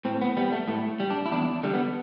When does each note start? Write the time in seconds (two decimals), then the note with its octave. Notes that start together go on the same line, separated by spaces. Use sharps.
0.05 A2 C4
0.21 B3
0.37 G3 B3
0.52 A3
0.68 A2 A3
1.00 G3
1.10 D4
1.26 E4
1.32 E2 D4
1.63 D3 G3
1.74 B3